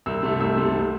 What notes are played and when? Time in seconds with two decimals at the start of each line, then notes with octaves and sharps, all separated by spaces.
0.06 C2 E6
0.23 C3 A3
0.40 C2 E6
0.57 C3 A3